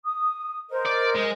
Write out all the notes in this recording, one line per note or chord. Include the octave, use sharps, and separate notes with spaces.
D#6
A#4 C5 D#5
D5
G#3